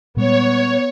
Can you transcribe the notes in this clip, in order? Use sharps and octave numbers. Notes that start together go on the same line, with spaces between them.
A#2 G3 G#3 B3 C#5